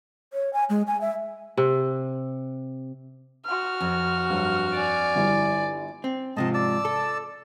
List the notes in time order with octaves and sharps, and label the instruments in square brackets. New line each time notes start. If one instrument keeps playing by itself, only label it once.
[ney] C#5
G#5
G#3
G#5
E5
[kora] C3
[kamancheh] F#4 F6
[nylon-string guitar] F2
[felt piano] G2 F#3
[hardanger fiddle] D5 G#5
[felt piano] G1 G3 E4
[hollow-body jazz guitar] C4
[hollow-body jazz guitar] G#2 C3 F3 [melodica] D#5 A5
[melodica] D5 A5 E6
[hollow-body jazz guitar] A4